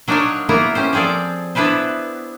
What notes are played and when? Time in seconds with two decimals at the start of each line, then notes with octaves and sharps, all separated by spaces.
0.08 F#3 D4 D#4 F4 A#4 C#5
0.49 A#3 B3 E4 F#4 A#4
0.75 C#4 G4 C5
0.93 F3 C4 G#4 A4 D5
1.55 B3 D4 E4 B4 C5